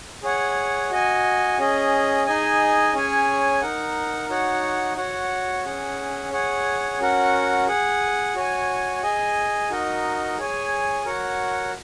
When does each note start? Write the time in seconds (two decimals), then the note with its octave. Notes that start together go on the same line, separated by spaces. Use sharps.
0.23 G#4 C#5 F#5
0.91 F#4 D#5 G#5
1.58 C#4 G#4 D#5
2.26 D#4 G#4 D#5 G#5
2.93 C#4 G#4 C#5 G#5
3.61 D#4 A#4 F#5
4.29 D#4 F#4 C#5 F#5
4.97 F#4 C#5 F#5
5.65 C#4 G#4 F#5
6.32 G#4 C#5 F#5
6.99 C#4 F#4 A#4 F#5
7.67 G#4 F#5
8.35 F#4 C#5 G#5
9.03 G#4 D#5 G#5
9.70 D#4 F#4 A#4 D#5
10.38 G#4 C#5 G#5
11.05 F#4 A#4 C#5 F#5